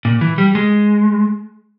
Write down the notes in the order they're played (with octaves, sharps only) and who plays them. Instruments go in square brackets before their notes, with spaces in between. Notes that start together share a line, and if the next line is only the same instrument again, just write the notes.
[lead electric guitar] A#2
E3
G3
G#3